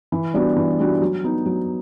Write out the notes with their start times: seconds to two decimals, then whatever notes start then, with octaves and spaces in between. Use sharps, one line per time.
0.12 E3
0.34 G3 B3 D4 F#4
0.56 E3
0.79 G3 B3 D4 F#4
1.01 F#3
1.24 B3 D#4
1.46 F#3